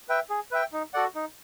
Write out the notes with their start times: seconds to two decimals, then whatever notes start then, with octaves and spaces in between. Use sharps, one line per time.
0.09 B4 E5 G5
0.30 G#4
0.51 B4 E5 G5
0.73 D#4
0.94 F#4 A4 D5 F#5
1.15 D#4